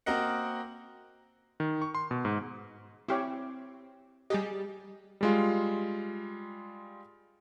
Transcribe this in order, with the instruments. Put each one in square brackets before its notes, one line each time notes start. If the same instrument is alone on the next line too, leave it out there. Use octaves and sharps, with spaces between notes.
[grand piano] A#3 C4 F#4 A#4 D#5 F#5
[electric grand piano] D#3
C#6
C6
B2
G#2
[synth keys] C4 [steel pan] E4 G4 C#5
[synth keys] G3 G4 [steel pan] G#4 D#5
[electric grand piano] G3 G#3 F4